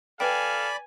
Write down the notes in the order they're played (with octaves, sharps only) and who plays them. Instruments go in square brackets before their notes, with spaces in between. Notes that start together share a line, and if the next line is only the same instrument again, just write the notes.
[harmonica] A4 F5 [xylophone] B4 G5 [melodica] D5 B5 [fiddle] G#5